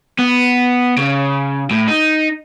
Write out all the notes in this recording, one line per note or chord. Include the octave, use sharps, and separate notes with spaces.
B3
C#3
A2
D#4